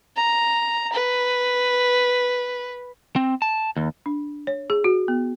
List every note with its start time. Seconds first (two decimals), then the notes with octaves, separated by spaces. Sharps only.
0.17 A#5
0.93 B4
3.16 C4
3.42 A5
3.77 D#2
4.06 D4
4.47 C#5
4.70 G#4
4.84 F#4
5.08 B3